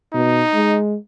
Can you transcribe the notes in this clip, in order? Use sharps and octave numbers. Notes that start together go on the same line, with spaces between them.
B2 D#4
G#3